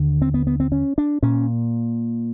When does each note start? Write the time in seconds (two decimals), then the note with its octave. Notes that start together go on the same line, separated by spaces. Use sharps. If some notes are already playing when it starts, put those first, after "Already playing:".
Already playing: D#2 D3
0.22 C4
0.34 B3
0.47 B3
0.60 C4
0.72 C#4
0.98 D4
1.22 A#2 C#4